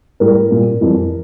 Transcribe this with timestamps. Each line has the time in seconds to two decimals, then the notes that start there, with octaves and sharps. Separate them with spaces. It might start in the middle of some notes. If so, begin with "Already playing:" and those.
0.20 A2 G3 A#4
0.51 A#2 G3
0.81 F2 E3 G3